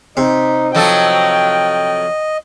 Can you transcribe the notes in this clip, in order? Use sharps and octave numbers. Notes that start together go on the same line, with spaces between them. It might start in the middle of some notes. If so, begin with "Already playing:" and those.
C3 D#4
F3 F#3 A4 D#5 G5